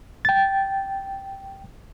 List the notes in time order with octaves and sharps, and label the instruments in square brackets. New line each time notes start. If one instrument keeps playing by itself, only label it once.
[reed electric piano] G5 A6